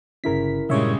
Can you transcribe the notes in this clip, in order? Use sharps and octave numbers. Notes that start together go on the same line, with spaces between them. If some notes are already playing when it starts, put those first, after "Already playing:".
G1 C#3 C#4 E4 A#4 B6
G2 A#2 C#3 G3 G#3 C#5 E5